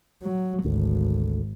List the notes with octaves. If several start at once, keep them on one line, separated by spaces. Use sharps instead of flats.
F#3
G#1 D2